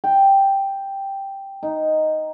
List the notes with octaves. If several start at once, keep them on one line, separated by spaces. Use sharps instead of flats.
G5
D#4